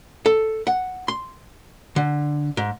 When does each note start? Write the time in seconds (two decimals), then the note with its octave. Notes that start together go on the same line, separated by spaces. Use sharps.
0.26 A4
0.67 F#5
1.08 C6
1.96 D3
2.57 G#2